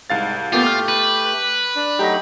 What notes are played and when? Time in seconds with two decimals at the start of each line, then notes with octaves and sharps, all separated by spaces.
0.10 C2 G#2 F5 A6
0.52 A#2 A3 B3 F4 G4 A6
0.66 F6
0.88 B4
1.76 D4
1.99 F#3 A3 D#4 G4 A#6